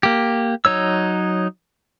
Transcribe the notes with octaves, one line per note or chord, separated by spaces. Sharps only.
A#3 G4
F#3 D#4 C#5 E6